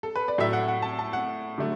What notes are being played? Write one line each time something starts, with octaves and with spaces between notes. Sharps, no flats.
A4
B4
D5
A2 F#3 A3 E5
F#5
F#5
A5
A5
F#5
D3 F#3 A3